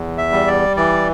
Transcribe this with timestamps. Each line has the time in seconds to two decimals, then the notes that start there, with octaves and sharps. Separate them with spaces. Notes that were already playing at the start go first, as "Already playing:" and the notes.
Already playing: E2
0.18 E5
0.32 G3
0.48 D5
0.77 E3 D5